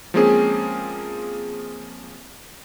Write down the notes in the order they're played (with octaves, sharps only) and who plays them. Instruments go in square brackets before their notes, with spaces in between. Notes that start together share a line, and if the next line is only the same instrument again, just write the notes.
[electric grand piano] F3 G#3 A#3 C4 C#4 G#4